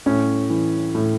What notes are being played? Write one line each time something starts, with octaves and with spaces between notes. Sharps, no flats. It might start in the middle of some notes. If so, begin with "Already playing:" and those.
A2 C#4
E3
A2